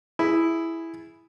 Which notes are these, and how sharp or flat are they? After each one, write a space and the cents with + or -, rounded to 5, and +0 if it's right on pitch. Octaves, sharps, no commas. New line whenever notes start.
E4 +0 G#4 +0